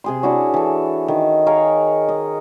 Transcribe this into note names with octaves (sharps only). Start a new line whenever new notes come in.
C3 G#4 C6
D4 E4 F#4 C#5
E3 A4
D#3
G#4 A#4 C#5 F5
D#5